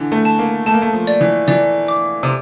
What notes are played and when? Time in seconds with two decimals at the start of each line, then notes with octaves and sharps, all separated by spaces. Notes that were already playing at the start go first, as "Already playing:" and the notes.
Already playing: D3 E3
0.12 A3
0.25 A5
0.39 A#3
0.66 A3 A5
0.74 A#3
0.82 A3
0.93 F3
1.07 D5
1.21 E3
1.48 E3 D5
1.88 D6
2.23 C3